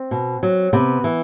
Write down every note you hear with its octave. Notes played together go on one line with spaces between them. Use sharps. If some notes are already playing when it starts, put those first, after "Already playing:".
Already playing: C4
B2
F#3
C3 B3
E3